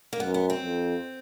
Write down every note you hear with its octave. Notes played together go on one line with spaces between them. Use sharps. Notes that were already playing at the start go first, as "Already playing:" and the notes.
A#3
F#2 B3
B3
C4
F2